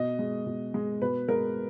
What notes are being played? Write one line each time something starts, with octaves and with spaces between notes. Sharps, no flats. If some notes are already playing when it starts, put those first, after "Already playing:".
Already playing: B2 D#5
G#3
B2
G#3
B2 B4
G#3 A#4